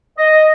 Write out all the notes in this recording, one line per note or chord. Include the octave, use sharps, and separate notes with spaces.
D#5